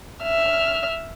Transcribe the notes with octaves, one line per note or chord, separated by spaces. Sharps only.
E5 F6